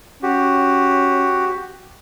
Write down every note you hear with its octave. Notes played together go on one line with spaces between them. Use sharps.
C#4 F#4 G4